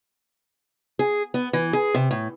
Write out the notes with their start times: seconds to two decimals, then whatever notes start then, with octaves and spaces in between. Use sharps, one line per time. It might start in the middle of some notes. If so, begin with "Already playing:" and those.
0.99 G#4
1.34 B3
1.53 E3
1.73 G#4
1.95 C3
2.11 A2